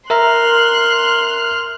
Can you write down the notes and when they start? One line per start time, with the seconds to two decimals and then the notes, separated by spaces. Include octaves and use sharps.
0.10 A#4 E5 A#5 C6 F6 F#6